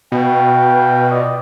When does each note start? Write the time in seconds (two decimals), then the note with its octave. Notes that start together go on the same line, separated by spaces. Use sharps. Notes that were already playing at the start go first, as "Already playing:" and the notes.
0.12 B2 B4 F5 G5
1.09 F4 D5 D#5